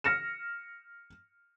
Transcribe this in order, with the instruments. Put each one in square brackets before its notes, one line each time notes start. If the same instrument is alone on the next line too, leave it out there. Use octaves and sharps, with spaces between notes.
[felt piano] F6 A#6 C#7 E7